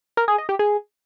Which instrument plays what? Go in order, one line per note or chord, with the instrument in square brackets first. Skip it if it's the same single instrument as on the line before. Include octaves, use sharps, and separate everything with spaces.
[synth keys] A#4
G#4
D#5
G4
G#4